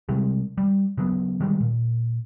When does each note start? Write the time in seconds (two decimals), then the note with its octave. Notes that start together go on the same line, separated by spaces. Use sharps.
0.09 C3 G3 G#3
0.58 G3
0.98 C#3 F#3 B3
1.40 D#3 G3 G#3
1.60 A#2